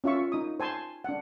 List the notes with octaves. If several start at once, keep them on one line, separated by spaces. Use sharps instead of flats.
C#4 F4 E5 C#6
D#4 D#6
C5 G#5 A5 C6
D4 F#5